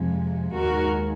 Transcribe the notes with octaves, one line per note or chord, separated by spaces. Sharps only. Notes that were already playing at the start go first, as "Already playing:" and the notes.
Already playing: F2 C3 F3 G#3
D#2 D#3 G#3 F#4 A#4